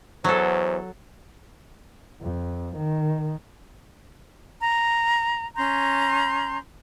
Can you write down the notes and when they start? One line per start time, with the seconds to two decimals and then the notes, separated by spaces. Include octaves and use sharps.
0.24 E2 F#3 A4 C5
2.21 F2
2.76 D#3
4.61 A#5
5.56 C#4 A#5 C6 G6